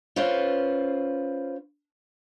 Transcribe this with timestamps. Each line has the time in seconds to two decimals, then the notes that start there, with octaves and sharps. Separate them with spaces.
0.16 C#4 F4 B4 C5 D5